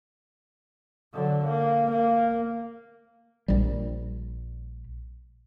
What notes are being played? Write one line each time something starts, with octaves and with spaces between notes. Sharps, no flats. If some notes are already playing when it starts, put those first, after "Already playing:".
D3 F#3
A#3
A#3
A#1 G3